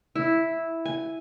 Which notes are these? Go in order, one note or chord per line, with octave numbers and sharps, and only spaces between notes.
E4
G#5